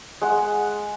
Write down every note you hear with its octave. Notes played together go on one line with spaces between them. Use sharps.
G#3 F#5